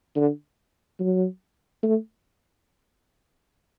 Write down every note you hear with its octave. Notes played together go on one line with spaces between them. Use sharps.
D3
F#3
A3